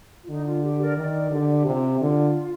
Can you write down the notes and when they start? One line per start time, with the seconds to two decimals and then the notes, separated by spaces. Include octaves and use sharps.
0.25 F4
0.29 D3 D#4
0.46 F4
0.63 G4
0.80 A#4 D5
0.97 D#3 A#4 D5
1.31 D3 G4
1.66 C3 F4
2.00 D3 F4